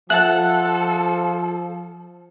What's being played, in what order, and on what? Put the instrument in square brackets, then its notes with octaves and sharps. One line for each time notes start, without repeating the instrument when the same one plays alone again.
[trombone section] F3 [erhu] A4 [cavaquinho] E5 F#5 A5 [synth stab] F#6